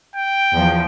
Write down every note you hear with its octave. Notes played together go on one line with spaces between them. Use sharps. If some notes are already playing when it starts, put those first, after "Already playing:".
G5
E2 F3